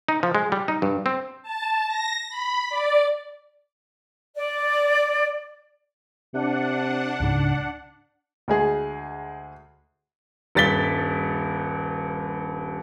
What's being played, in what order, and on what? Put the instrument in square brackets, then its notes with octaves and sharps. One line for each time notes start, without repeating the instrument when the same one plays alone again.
[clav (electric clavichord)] D#4
F3
G#3
G3
D#4
G2
C4
[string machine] A5
A#6
B5
D5
[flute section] D5
[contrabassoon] C3 [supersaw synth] D4 F#5
[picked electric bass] C#2 G#2 C#3
[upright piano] D2 G#3 G#4
[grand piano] D#1 G2 A6 B6 G7